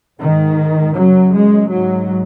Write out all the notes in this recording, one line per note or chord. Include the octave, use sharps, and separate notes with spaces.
G#2 D#3
F#2 C#3 F#3
G#3
G#2 F#3